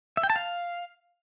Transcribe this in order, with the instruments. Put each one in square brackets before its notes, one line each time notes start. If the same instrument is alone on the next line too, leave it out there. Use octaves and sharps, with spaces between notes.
[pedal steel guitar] E5
G5
A5
F5